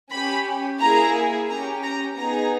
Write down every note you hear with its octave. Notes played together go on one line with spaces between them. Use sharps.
C#4 G4 B5
A#3 E4 G#4 A#5
C#4 G4 A#5
A#5
B3 D#4 G#4 A#5